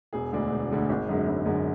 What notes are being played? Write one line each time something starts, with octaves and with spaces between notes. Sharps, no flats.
E1 G#4
D2 D3 G#3 D4
E1
D2 D3 G#3 D4
G#1
F#2 D3 G#3
G#1
F#2 D3 G#3